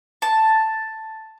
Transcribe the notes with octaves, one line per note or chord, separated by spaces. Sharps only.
A5